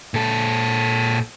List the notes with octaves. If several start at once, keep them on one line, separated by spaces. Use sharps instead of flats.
A#2 A4